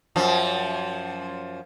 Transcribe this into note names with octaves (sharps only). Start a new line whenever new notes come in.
F#2 F3